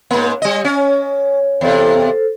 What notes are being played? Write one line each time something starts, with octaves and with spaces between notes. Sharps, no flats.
G#2 A#3
G3 D#5
C#4
E2 C3 A4 C5